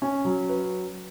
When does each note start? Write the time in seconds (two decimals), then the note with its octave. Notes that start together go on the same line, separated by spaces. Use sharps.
0.02 C#4
0.25 F#3
0.49 B4